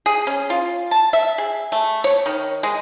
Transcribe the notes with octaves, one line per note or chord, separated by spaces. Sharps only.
G#4
C#4
F4
A5
E5
G#4
A3
C#5
D#3
G#3